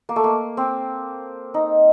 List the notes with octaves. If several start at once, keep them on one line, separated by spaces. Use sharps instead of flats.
A#3
A3
A#3
C4
D#4